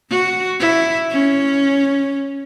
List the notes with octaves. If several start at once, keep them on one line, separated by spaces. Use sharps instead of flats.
F#4
E4
C#4